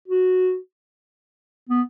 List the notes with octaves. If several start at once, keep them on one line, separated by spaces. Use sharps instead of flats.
F#4
B3